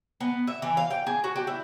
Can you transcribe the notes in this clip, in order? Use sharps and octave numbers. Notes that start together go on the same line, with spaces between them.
B3
E5
E3
F5
G5
G#4
F#4
G4
E4